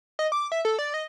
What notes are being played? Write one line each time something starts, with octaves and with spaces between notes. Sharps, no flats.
D#5
D6
E5
A4
D5
D#5